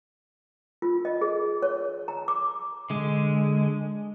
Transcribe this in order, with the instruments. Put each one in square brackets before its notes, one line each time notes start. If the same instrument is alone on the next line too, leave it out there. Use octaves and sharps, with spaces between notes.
[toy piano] F4
D#5
G#4
C#5
A#5
D6
[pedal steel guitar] D3 G#3